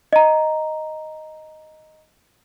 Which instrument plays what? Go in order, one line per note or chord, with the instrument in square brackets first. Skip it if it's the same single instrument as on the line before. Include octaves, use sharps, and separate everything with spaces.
[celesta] D#5 A#5